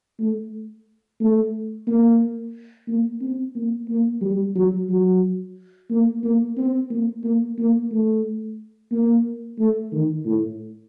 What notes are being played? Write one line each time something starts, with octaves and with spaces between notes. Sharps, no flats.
A3
A3
A#3
A#3
C4
A#3
A#3
G3
F#3
F#3
A#3
A#3
C4
A#3
A#3
A#3
A3
A#3
A3
D#3
A2